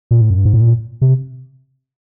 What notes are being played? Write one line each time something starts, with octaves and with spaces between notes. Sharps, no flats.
A#2
A2
F#2
G2
G#2
A2
A#2
C3